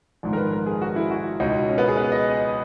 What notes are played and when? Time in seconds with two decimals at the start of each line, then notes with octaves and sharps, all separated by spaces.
0.23 A#1 G#2 D#3
0.33 A#4
0.37 B4
0.52 A#4
0.66 G#4
0.81 F#4
0.96 E4
1.11 F#4
1.40 C#2 B2 D#4
1.69 C#4
1.78 B3
1.88 G#4
1.97 B4
2.12 D#5